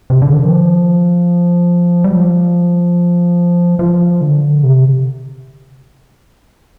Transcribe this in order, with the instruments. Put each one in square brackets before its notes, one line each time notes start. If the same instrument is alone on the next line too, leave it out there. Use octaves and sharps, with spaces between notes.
[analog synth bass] C3
D3
D#3
F3
G3
F3
F3
D3
C3